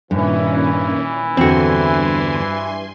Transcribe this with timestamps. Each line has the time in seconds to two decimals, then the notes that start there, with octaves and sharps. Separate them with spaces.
0.11 G2 A#2 D#3 E3 C#4
1.37 E2 G2 D3 C4 F#4 G#5 C6